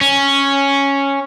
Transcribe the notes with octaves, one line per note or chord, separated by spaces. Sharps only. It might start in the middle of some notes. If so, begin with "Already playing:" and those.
C#4